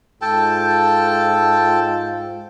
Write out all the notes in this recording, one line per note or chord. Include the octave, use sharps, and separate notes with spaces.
G#2 F4 A4 G5 A5